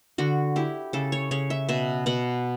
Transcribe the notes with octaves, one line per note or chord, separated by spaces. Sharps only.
D3 F#4
E4 G4
C#3 A4
C#5
C#3 C#5
E5
B2 E5
B2 F#5